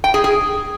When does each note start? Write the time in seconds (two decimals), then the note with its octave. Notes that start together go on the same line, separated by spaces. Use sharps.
0.04 G5
0.14 G#4
0.24 G#4